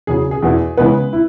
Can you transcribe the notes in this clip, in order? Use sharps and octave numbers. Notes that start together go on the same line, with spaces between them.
E2 C#3 F#3 G#4
G#4
E2 B2 B3 E4
C#3 E3 G#3 B3 B4
E4